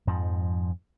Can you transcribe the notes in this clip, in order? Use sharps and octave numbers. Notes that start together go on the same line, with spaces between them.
F2 G#2 F3